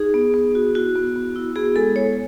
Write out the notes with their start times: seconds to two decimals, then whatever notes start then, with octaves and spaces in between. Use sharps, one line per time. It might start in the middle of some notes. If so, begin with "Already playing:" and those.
Already playing: D#4 G#4
0.14 B3
0.34 B3
0.55 F#4
0.75 E4 F#4
0.96 B3
1.16 B3
1.36 E4
1.56 B3 G#4
1.76 G#3 A4
1.96 G#3 C#5